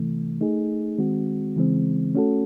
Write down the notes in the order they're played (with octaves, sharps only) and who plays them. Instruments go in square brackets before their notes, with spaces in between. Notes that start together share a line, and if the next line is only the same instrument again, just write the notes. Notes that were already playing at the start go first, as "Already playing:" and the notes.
Already playing: [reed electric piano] C3 E3 A3
A3 D#4 G#4
D#3 G#3 C4 F#4
C#3 E3 G#3 C4
A3 C#4 F#4 A4